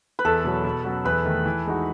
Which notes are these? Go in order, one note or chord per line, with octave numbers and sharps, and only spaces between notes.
B4
E2 A4
B2 F#3
B2
F#3 C#4 F#4
E2 B4
D#3 A3 D#4
E3
G#3 D#4 F#4